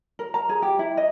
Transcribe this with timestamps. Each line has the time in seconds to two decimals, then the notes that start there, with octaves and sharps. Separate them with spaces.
0.19 A#4
0.34 A#5
0.49 G#4
0.62 G4
0.79 E4
0.97 D#5